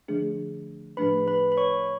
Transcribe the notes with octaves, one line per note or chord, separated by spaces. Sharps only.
D3 F3 A3 D4 G#4
A2 F3 A3 D4 B4 B5
B4 B5
B5
C#5 C#6